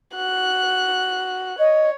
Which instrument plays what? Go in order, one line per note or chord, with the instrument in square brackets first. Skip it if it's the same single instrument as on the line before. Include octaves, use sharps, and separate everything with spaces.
[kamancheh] F#4 F#6
[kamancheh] C#5 [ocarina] D#5